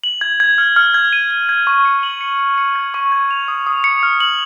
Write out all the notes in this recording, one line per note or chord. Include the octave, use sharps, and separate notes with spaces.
F#7
G#6
G#6
F6
F6
G#6
D#7
G#6
G#6
C#6
C#7
F#7
C#7
C#7
C#7
G#6
C#6
G#6
F7
D#6
D#6
C#7
F6
F#7